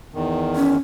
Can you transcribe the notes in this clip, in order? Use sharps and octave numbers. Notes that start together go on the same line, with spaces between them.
E2 D#3
C#4